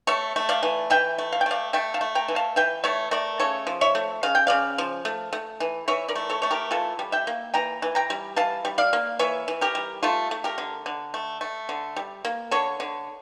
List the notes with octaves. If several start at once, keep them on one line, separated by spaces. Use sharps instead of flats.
A3 C#5 E5
A3
D5 F5
E3
E3 E5 G5
A3
F5
G5
A3 D5 F5
A3 E5 G5
F5 A5
A3
G5 A#5
E3
F5 A5
E3 E5 G5
A3 C#5 E5
A3 A#4 D5
C#3 A4 C#5
F3
C#5 E5
A3
C#3 F5
G5
C#3 D5 F5
F3
A3
A3
E3
E3 C#5 E5
A#4 D5
A3
A4 C#5
A3 C#5
G4 A#4
E3 F4 A4
G3
E5 G5
A#3
E3 G5 A#5
E3
G5 A#5
G3
E3 F5 A5
G3
D5 F5
A#3
E3 C#5 E5
E3
G4 A#4
G3
A3 F4 A4
A3
G4 A#4
D3
D3
A3
A3
D3
G3
A#3
D3 A4 C#5
D3